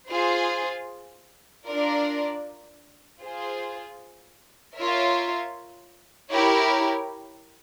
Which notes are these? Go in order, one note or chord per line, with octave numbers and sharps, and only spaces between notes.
F4 G#4 C5
D4 F4 A#4 D5
F4 G#4 C5
F4 A#4 C#5 E5
E4 G4 A#4 C#5